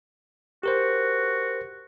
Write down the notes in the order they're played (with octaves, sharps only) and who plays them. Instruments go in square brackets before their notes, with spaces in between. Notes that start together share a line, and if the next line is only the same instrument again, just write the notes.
[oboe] F#4 [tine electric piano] G4 A#4 C5